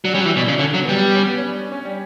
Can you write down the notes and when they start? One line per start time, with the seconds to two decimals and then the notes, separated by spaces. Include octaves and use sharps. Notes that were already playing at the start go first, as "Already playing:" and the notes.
0.05 F#3 D4
0.14 G3 C#4
0.21 F#3
0.25 E3
0.36 B2 D4
0.48 C#3
0.54 D4
0.59 D3 C#4
0.74 F#3
0.82 B3
0.89 G3
1.04 B3
1.15 C#4
1.27 B3
1.38 C#4
1.49 D4
1.72 C#4
1.85 G3